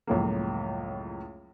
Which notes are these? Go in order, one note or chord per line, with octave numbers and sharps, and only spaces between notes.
C#2 F#2 A2 F3 A3 A#3